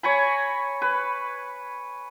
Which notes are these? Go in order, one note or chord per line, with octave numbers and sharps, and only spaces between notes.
C#5 G#5 A#5 B5
B4